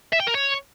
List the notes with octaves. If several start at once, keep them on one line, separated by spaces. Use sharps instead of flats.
E5
G5
A#4
C#5